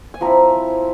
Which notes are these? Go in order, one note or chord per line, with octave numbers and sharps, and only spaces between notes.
G#5
F3 C4 E4 A#5